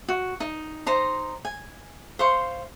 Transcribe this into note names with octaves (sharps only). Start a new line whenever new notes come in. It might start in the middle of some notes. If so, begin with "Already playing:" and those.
F#4
D#4
D#4 C5 A#5 C6
G#5
C5 F5 C6 C#6